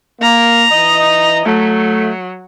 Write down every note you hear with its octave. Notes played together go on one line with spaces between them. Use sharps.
A#3 A#5
E3 D#5
F#3 A3